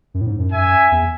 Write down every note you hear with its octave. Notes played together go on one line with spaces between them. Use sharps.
F#2
A2
G#2
F#2
E5 G#5
E2